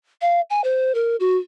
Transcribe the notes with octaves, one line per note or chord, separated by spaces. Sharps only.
F5
G#5
C5
A#4
F#4